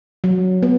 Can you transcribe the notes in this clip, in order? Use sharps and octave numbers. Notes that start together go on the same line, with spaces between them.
F#3
B3